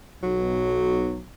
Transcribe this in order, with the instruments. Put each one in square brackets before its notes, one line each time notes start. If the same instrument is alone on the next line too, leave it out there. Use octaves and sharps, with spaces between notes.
[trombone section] B1 [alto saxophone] F#3